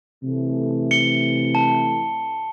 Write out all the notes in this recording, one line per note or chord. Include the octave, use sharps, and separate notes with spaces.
C3 E3 A3
C#7 G7
A5